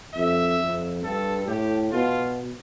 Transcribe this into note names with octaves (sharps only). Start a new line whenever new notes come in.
F2 E5
F2
G2 A4
A2 G4
B2 F4